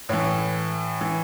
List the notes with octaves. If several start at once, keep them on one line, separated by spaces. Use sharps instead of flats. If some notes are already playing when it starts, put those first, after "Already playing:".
A2 E3 C#5
E3